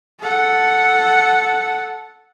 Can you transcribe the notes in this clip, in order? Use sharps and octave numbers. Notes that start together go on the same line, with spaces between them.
A4 F#5